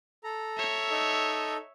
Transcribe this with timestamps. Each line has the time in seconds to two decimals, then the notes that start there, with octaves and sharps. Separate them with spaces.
0.24 A4 A#5
0.57 C#5 E5
0.91 D#4 A4 D#5